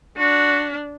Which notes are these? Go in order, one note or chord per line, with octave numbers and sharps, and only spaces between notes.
D4 F#4